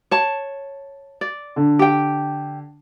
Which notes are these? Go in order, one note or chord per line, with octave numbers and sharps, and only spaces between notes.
C#5 A5
D5
D3
G4 G5